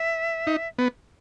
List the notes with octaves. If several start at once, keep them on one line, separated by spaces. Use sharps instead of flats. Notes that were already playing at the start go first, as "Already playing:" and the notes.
Already playing: E5
D#4
B3